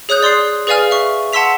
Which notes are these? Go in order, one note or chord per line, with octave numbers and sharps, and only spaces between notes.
G#4 C#5 D#6 F#6 G6
D5 C6 D#6 C7
G#4 B4 D5 F5 G#5 F6
E5 C#6
F#5 A5 C6 E6 B6 F7